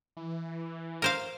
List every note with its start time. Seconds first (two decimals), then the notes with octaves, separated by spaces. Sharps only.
0.17 E3
1.02 A#4 C5 F5